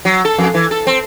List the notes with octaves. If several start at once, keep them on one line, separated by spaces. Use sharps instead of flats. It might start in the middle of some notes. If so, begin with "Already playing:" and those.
F#3
A4
F2
E3
A4
C4